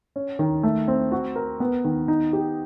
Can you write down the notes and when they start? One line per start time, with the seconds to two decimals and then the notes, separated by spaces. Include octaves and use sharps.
0.16 C#4
0.39 D#3
0.63 A3
0.88 C4
1.12 F#4
1.36 A#4
1.60 B3
1.85 D#3
2.08 D#4
2.33 G4